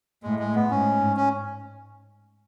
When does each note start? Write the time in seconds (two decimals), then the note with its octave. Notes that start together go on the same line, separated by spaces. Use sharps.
0.23 A2 G#3
0.39 G#3
0.55 B3
0.69 G#2 C#4
1.17 C#4